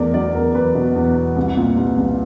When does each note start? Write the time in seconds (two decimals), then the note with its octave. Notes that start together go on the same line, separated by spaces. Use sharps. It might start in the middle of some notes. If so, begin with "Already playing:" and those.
Already playing: E2 A3 A#4 D5
0.14 F#3 D5
0.35 E2 A#4
0.55 E2 B4
0.75 B2
0.96 E2
1.16 E2
1.36 C2
1.57 A#2
1.77 C2
1.98 C2